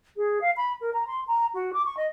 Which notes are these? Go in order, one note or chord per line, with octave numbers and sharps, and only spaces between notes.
G#4
F5
B5
A#4
A#5
C6
A#5
F#4
D6
C#6
D#5